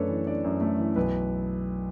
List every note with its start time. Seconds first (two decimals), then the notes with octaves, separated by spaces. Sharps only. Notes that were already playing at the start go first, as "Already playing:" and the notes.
Already playing: F#2 A3 D4 A4 B4 C#5
0.08 E3
0.26 D4 D5
0.44 F#2
0.61 A3
0.78 E3
0.96 B1 B4